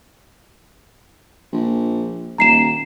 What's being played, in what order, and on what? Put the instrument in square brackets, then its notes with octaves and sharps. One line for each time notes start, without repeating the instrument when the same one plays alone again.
[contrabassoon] A#1
[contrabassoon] D#1 [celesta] A#5 C7 E7